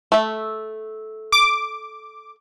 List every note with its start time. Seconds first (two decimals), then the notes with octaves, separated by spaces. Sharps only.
0.12 A3 E5
1.32 D6